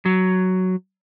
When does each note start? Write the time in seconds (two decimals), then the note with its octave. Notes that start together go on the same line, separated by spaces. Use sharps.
0.05 F#3